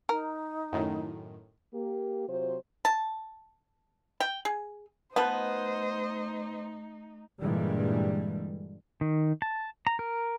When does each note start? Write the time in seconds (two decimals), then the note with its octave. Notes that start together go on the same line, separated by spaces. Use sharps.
0.09 D#4 A#4
0.72 F#2 A2 D#3
1.73 A#3 G4
2.27 C3 F#3 F4 C5
2.85 A5
4.20 G5
4.45 G#4
5.16 F3 A3 B3 D#4 B4 C5 D#5
7.42 G2 A#2 D3 E3 G3 G#3
9.01 D#3
9.42 A5
9.87 A#5
9.99 A#4